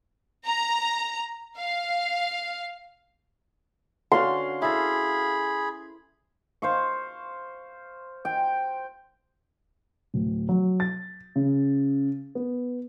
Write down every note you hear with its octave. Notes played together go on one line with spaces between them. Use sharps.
A#5
F5
D3 C#4 F#4 F5 C6
E4 G#4 A4 B5
C5 F5 C#6
G5
D1
F#3
A6
C#3
B3